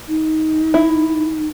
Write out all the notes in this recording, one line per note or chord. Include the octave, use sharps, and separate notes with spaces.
D#4
E4